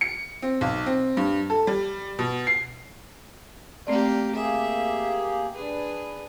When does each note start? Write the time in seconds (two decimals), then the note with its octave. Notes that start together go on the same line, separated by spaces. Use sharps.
0.01 C#7
0.42 C4
0.61 B1
0.86 C4
1.17 G2
1.50 A4
1.67 G3
2.19 B2
2.47 C7
3.87 A3 A#3 C4 G4 D5
4.36 A#3 G4 G#4 E5
5.55 D4 G#4 B4